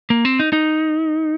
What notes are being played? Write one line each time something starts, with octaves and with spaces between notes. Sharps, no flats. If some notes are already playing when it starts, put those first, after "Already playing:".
A#3
C4
D#4
D#4